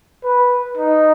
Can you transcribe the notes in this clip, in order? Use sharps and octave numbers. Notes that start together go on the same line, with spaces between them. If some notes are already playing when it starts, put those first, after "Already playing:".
B4
D#4